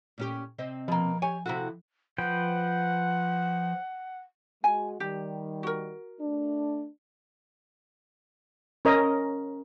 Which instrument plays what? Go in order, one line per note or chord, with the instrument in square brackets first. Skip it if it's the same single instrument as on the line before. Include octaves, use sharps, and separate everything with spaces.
[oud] A#2 C#4 G4
C3 C4 D#5
[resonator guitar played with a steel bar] B2 A#3 [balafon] F3
[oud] G4 C#5 [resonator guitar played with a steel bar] G#5
[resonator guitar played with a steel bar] C3 F#4 [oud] F3 E4 A4
[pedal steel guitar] F3 B4 G5 [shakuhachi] F#5
[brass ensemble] G#3 F#4 [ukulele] G#5
[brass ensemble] D#3 G3 [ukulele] G4
[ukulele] F#4 A#4
[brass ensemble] A3 D4
[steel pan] C#4 A#4 D#5